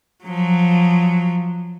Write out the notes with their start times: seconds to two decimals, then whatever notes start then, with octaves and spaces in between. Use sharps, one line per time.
0.24 F3 F#3